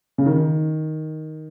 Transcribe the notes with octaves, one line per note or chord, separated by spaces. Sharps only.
C#3
D#3